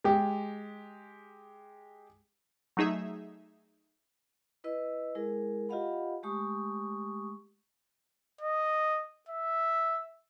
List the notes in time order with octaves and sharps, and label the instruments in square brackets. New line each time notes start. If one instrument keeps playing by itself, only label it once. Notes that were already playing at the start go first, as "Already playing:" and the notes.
[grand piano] G#3 G4
[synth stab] F#3 A3 D#4 G#4 E5
[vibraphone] E4 B4 D#5 E6
G#3 E4 G#4 A#4
F4 G4 D#5 F5 F#5 B5
G#3 A3 G4 C#6 D#6
[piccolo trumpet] D#5
E5